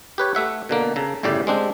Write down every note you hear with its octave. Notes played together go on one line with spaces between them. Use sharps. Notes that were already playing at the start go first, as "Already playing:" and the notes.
G4 B4 C#5
A3 E5 F#5
B2 D3 A#3
C#3 A4 A#5
G1 A2 C#3 G4 D5
G#3 C4 D4 G4